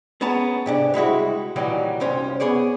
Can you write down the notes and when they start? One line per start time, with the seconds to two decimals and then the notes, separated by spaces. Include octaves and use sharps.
0.21 B3 C#4 G#4 A5 A#5
0.66 G#2 C3 D4
0.94 G3 G#3 E4 F#4
1.56 A#2 D#3 E3 F#3 G3
2.00 C2 F#2 C#4 C5
2.40 B3 G#4 C#5 D5